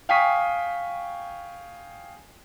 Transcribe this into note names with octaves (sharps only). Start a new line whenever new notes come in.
F5 G5 G#5 C#6 D#6 B6